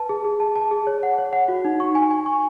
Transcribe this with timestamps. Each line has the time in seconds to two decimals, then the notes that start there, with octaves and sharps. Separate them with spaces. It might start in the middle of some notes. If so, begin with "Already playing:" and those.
Already playing: B4 A5
0.09 G#4
0.24 G#4
0.40 A5
0.56 A5
0.71 G#4
0.87 C#5
1.03 F#5
1.18 C#5
1.33 F#5
1.48 F#4
1.65 D#4
1.80 C#6
1.95 G#5
2.11 G#5
2.26 C#6